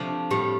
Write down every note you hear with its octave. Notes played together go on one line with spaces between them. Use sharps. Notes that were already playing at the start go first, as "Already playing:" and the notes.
Already playing: C3 F3 A3 D4
A2 G3 F4 G4